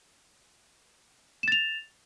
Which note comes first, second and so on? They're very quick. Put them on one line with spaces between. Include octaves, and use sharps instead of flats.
E7 A6 F7